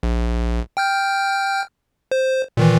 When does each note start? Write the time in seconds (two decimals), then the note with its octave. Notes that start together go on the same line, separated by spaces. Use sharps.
0.03 A#1
0.77 G5 F6 G6
2.11 C5
2.57 A#2 D#3 E3